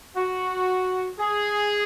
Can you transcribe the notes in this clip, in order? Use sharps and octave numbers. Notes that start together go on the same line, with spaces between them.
F#4
G#4